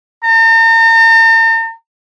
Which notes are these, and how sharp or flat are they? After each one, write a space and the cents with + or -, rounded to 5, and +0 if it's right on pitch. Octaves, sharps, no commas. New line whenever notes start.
A#5 -45